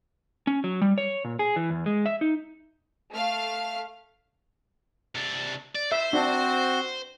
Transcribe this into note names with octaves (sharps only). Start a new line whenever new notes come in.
C#4
F#3
G3
C#5
A#2
G#4
E3
E2
G#3
E5
D#4
A3 F5 F6
C3 D4
D5
C5 E5
C4 D4 F#4